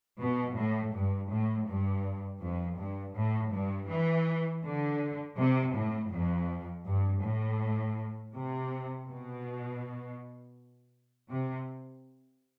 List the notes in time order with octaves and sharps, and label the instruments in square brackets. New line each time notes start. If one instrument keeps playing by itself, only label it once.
[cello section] B2
A2
G2
A2
G2
F2
G2
A2
G2
E3
D3
C3
A2
F2
G2
A2
C3
B2
C3